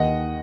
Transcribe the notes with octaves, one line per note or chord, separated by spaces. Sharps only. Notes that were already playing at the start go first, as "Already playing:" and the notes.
Already playing: D#2 D#3 D#5 F#5